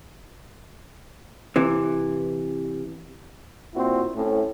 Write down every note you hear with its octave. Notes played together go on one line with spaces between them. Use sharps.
C3 E3
A#2 C4 E4 F#4
A2 A3 C4 C#4